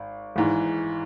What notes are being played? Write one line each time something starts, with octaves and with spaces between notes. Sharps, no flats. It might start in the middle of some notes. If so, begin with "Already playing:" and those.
Already playing: G#1
G#1 G#2 E3